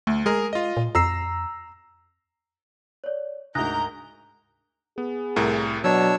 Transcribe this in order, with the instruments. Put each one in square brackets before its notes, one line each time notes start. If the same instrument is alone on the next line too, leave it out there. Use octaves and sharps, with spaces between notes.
[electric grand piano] D2 [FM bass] A3
[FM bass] G#3 [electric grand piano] G#4 A#4
[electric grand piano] F4 D#5
[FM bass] A#2
[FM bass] F2 [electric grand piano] A#5 E6 C7
[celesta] C#5 D5
[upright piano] D2 G#2 [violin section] A#4 A#5 G6 [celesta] D#6 F#6 A#6
[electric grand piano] B3 [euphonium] G#4
[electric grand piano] C2 A2 A#4
[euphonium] B2 [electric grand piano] F#3 [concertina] D4 C#5 E6